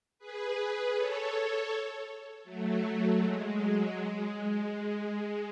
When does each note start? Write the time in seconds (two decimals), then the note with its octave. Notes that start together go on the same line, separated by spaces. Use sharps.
0.19 G#4 B4
0.56 G#4 B4
0.94 A4 C#5
2.44 F#3 A3
3.19 G#3
3.57 F#3
3.94 G#3
4.31 G#3